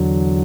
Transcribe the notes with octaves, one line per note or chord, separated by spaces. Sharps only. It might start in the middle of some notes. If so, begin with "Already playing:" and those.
Already playing: E2 D3 F#3